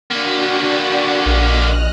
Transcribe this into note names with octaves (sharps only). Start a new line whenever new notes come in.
D3 A#3 D4 F#4 G5
A#1 D#5 F6 F#6